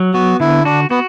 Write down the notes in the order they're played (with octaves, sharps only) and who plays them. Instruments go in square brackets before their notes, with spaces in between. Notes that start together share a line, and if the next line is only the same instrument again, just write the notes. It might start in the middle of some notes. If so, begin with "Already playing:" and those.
Already playing: [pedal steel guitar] F#3
[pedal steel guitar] B3 [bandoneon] F#4
[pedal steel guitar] D3 [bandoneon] E4
[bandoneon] D4 [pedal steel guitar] F#4
[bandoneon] B3 [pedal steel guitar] F#4